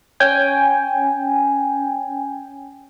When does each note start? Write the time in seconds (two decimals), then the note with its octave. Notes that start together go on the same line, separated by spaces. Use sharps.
0.20 C#4 G5 G#5